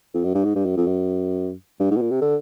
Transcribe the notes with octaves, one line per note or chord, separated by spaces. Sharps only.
F2
F#2
G2
G#2
G2
F#2
F2
F#2
G2
G#2
B2
A#2
C3
D3